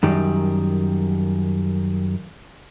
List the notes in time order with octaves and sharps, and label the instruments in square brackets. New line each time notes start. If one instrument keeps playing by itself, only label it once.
[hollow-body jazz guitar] F#2 D#3 G3